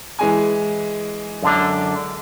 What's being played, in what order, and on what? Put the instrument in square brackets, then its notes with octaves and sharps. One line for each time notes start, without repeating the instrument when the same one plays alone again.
[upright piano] E3 G#3 G#5
[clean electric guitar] F#2 D3 D4